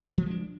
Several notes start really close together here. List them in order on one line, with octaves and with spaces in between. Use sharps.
F3 A3 G#3 D4